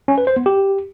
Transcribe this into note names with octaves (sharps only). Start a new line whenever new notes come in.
C#4
B4
C5
B3
G4